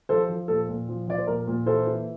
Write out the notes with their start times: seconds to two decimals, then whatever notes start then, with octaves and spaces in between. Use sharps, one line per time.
0.09 F3 A4 C5
0.29 F3
0.48 A#2 A4
0.69 A#2
0.89 F3
1.07 F3 D5
1.18 C5
1.27 A#2 A#4
1.48 A#2
1.66 E3 A4 C5
1.87 E3